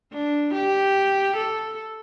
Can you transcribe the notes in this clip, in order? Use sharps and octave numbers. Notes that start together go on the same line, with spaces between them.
D4
G4
A4